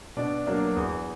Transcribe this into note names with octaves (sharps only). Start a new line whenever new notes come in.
B2 D4 D5
F#3 A#3 D4
E2